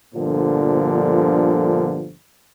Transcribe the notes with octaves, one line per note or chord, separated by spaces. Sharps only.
G1 A#2 D3 F3